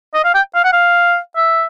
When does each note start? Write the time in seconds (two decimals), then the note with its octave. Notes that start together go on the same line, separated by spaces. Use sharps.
0.14 D#5
0.25 F5
0.34 G5
0.55 F5
0.64 F#5
0.73 F5
1.36 E5